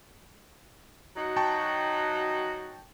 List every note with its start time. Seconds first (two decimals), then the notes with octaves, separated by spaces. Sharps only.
1.17 F#3 D#4 F#4
1.36 G5 A5 C#6